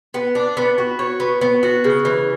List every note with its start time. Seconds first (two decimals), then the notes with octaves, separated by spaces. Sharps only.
0.14 B3
0.35 D4
0.57 B3
0.78 F#4
0.99 C#5
1.20 B3
1.41 B3
1.63 F#4
1.84 C#3
2.05 E3